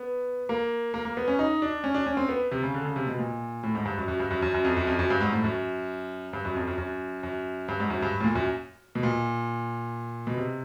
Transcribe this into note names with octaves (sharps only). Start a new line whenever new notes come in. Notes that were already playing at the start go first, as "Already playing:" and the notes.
Already playing: B3
A#3
A#3
A#3
B3
C#4
D#4
D4
C#4
D4
C#4
C4
B3
C3
C#3
D3
C#3
C3
B2
A#2
A2
G#2
G2
F#2
F#2
G2
F#2
F#2
F#2
F2
F#2
F2
F#2
G2
G#2
A2
F#2
G2
F#2
F2
F#2
F#2
F#2
G2
G#2
F#2
G2
A2
A#2
F#2
B2
A#2
B2
C3